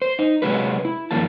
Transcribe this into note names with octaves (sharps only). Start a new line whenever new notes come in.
C5
D#4
C3 F#3 G#3 F#4 G#4 B4
E4
G2 D#3 F3 A#3 A5